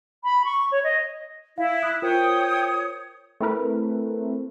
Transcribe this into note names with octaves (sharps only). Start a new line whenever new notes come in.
B5
C#6
C#5
D#5
E4 F5
D#6 F#6
F4 A#4 C5 C#5 G5 D#6
A3 C4 E4 A#4 B4